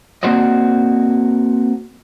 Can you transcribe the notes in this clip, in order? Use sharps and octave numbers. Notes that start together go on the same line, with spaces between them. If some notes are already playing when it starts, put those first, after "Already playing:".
A#3 C4 F#4 C5 D5 D#5